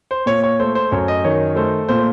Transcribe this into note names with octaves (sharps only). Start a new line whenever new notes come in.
C5
A#2 C#5
C#5
A3 C5
C5
F#2 C#5
D#5
D#3 C#5
A3 C5
A#2 C5